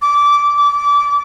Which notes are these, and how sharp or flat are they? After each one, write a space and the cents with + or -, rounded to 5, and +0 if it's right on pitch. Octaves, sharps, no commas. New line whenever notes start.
D6 -20
D6 -25